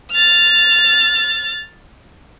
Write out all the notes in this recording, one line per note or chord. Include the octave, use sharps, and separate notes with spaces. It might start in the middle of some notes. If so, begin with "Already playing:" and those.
F6 A6